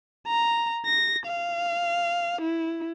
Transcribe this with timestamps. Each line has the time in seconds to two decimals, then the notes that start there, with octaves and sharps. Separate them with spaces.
0.27 A#5
0.86 A#6
1.26 F5
2.41 E4